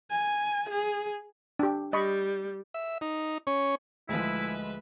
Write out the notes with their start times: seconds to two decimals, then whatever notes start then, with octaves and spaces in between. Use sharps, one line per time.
0.11 G#5
0.69 G#4
1.59 D4 G4
1.93 G3 D#5 B5 C#6
2.74 E5
3.01 D#4
3.47 C#4 C#5
4.09 D2 F3 G#3 E4 B4 E5